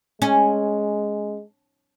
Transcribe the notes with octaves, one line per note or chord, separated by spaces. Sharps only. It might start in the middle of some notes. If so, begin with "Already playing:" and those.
G#3 C#4